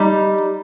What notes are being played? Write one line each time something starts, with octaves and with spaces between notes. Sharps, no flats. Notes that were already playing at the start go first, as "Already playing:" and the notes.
Already playing: G3 D#4